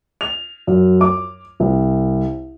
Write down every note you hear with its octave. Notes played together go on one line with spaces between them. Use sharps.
F7
F#2
D6
C2